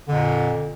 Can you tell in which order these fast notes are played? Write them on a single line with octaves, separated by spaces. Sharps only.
F2 D3 A#2